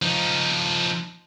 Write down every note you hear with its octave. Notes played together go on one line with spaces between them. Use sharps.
F3 D#4